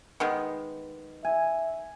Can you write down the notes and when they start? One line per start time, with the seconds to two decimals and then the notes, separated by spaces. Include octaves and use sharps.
0.20 D#3 G#3 B3
1.25 E5 G#5